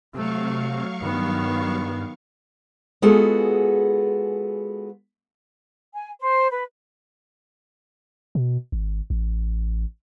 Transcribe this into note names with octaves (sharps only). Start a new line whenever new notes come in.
C3 F#3 A3 F5 C#6
G2 D#3 B3
G#3 B3 F4 F#4 G#4 A4
G#5
C5
B4
B2
G#1
A1